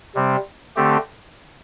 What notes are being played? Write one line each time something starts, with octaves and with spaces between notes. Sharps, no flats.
C3 G3 C4
D3 A3 C4 G4